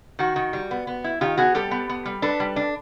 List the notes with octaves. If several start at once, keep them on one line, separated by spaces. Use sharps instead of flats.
D#3 F#4
D#3
G3
B3
B3
E4
D#3 F4 G4
B3 F#4 G#4
G3 G4 A4
B3
B3
G3
D4 A4 B4
G3
D4